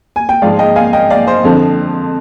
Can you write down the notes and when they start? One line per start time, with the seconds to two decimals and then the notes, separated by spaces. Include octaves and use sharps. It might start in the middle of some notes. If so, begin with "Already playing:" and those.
0.16 G#5
0.29 G5
0.42 G#2 F3 G#3 D5 F5
0.59 D#5 G5
0.76 F5 G#5
0.93 D#5 G5
1.10 D5 F5
1.27 C5 D#5
1.44 F2 D3 F3 C4